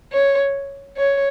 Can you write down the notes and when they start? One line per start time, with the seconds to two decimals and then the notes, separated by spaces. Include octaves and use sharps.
0.12 C#5
0.97 C#5